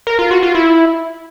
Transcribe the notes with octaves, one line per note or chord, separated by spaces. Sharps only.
A#4
F4
F#4
F4
E4